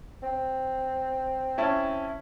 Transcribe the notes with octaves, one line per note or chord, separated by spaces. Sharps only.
C4
C#4 E4 A5